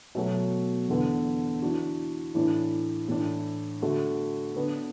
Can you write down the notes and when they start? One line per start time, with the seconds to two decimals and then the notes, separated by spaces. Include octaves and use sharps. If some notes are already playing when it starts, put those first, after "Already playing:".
0.15 B2 F#3 A3 F#4
0.88 E2 D3 B3
1.62 E3 D4 F#4
2.35 A2 E3 D4
3.08 A2 E3 D4
3.82 D3 A3 F#4
4.55 D3 B3 D4